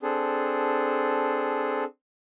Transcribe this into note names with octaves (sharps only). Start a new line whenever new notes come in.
C4 D4 G#4 A4